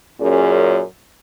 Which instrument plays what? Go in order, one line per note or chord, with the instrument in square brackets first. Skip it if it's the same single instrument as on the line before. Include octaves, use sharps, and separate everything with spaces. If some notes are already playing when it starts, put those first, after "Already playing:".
[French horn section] F#2 A#2 C#4 G#4